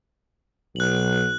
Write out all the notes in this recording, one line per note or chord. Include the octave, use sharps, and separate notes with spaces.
B1 F#6 F#7